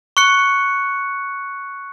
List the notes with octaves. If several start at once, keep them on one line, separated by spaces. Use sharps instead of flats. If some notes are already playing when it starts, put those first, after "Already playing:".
C#6 F#6 C#7